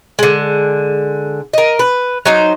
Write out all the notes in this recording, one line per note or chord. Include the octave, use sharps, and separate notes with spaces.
D3 G#3
A#4 D#5
B4
F#3 D#4 C5